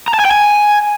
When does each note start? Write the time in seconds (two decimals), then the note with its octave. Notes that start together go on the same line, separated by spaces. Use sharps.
0.08 A#5
0.14 A5
0.19 G#5
0.25 G5
0.31 G#5